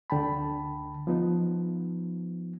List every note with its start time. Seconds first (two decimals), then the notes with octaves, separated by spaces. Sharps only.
0.10 D2 D3 G5 A5 B5
1.07 F3 B3 D#4